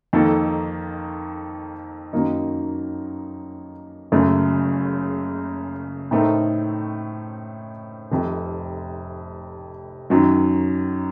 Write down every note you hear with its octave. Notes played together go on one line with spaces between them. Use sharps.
F2 D#3 A#3 D#4 A4
F#2 D#3 F#3 A#3 D#4
F#1 F#2 C#3 A3
A2 A3 C4 D#4 A#4
F1 F2 C3
F#2 D#3 F#3